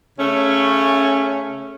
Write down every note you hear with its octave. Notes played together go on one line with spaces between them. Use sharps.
C#3 A3 C#4